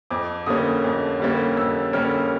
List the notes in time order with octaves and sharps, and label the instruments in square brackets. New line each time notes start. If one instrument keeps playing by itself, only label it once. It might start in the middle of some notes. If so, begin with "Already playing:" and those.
[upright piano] F2 D6
D3 G3 A#3 C#4 D#6
F2
D3 G3 A#3 C#4
F2 E6
D3 G3 A#3 C#4 F6